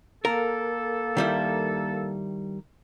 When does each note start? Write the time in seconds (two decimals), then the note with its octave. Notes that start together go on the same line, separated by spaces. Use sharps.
0.25 A#3 A4 A#4
1.17 D#3 G3 E4